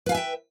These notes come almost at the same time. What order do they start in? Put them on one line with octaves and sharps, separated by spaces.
B4 F5 G#5 E5 G5